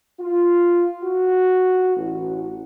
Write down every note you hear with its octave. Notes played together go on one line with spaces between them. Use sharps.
F4
F#4
A1